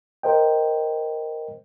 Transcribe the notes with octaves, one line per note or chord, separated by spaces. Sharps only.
A#4 C5 D#5 G5